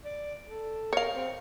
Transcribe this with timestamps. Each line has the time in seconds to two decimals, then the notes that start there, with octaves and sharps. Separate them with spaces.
0.05 D5
0.47 A4
0.93 A#4 C#5 F5
1.14 C4